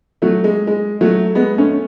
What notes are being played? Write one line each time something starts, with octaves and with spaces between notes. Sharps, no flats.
F#3 A3
G#3
G#3
F#3 A3
G#3 B3
A3 C#4